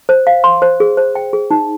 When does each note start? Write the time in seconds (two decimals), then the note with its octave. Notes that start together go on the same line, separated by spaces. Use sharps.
0.09 C5
0.27 F5
0.44 C6
0.62 C5
0.80 G#4
0.97 C5
1.15 G5
1.33 G#4
1.51 D#4